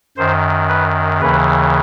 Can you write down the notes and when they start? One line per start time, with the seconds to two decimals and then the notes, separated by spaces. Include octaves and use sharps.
0.17 F#2 D#3 C5
0.69 B4
1.21 D#2 C#3 E3 B4